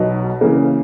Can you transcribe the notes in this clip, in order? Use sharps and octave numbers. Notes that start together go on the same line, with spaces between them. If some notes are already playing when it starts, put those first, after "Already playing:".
Already playing: B1 B2 F#3 B3 D#4
C#3 E3 A#3